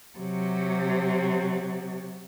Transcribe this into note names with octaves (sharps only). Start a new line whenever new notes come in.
C3 F#3